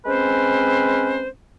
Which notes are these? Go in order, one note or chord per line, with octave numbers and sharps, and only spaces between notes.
G#3 C4 C#4 B4 C5